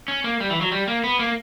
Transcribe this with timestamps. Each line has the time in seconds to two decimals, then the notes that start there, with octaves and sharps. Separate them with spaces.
0.08 C#4
0.24 A#3
0.40 G3
0.50 E3
0.61 F#3
0.72 G3
0.88 A#3
1.04 B3
1.19 A#3